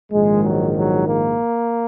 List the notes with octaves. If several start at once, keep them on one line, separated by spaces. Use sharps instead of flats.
A#1 G#2 D#3 G#3
F#3
F#3
A#3